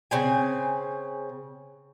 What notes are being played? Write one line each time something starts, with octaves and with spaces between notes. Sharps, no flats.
C#3 C4 G#5